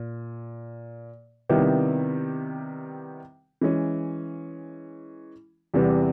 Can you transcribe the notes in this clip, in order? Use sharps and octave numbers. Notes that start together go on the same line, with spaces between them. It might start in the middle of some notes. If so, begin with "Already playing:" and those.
Already playing: A#2
C3 D#3 G3 B3 E4
E3 G#3 C#4
E2 C3 E3 G3 B3